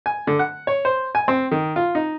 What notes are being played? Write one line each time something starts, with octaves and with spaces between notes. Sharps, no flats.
G#5
D3
F#5
C#5
C5
G#5
C4
D#3
F4
D#4